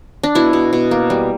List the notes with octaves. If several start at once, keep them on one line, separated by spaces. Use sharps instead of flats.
D4
B2 E4
B2
B2
A#3
G3